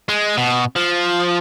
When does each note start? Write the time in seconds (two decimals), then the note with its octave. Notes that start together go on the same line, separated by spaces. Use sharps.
0.09 G#3
0.37 B2
0.76 F3